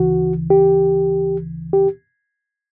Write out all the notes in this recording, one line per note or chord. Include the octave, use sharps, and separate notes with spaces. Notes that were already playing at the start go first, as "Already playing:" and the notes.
Already playing: D2 C#3 E3 F#4
G4
G4